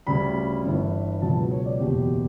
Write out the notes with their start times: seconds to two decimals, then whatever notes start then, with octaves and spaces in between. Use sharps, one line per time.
0.07 D2 C#3 G3 B5
0.64 G1 G2 E3
1.22 C#2 B2 F#3 A5
1.37 B4
1.51 C#5
1.65 D5
1.80 F#1 E2 B2 G4